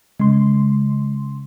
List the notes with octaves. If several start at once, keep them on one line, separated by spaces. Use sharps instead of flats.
C#3 G#3 C6